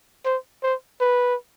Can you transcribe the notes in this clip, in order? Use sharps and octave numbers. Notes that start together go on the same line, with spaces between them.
C5
C5
B4